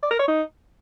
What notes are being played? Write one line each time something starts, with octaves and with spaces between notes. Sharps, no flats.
D5
A#4
C#5
D#4